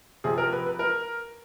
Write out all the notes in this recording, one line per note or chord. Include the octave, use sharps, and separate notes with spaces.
C3 F3 G#4
A#4
B4
B4
A#4